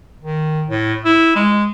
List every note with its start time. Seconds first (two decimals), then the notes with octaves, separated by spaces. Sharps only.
0.22 D#3
0.69 A2
1.05 E4
1.36 G#3